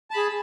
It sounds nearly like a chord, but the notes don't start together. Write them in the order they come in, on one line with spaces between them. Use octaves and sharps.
A5 B5 G#4